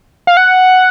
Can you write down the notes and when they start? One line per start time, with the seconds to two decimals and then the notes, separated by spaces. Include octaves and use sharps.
0.27 F5
0.37 F#5